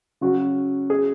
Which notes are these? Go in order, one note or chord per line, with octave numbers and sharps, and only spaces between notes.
C#3 F#3 C#4 F#4
G#4